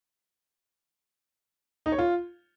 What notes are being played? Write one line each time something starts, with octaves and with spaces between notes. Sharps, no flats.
D#4
C#5
F4